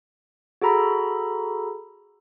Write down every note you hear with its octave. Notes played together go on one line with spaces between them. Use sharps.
F#4 G#4 A4 A#5 B5